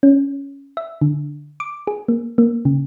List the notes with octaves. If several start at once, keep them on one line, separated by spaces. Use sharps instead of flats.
C#4
E5
D3
D6
G#4
A#3
A#3
C#3